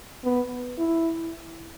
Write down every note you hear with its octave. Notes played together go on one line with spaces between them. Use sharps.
B3
E4